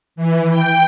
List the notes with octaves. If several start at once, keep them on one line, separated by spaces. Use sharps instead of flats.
E3
G5